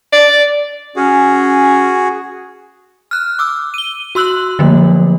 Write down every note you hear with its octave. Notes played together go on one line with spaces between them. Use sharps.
D5
C#4 F#4 G#4
F6 F#6
D6 E6
D#7 G7
F#4 C6 E6 F#6 F#7
D3 F3 F#3 A3 A#3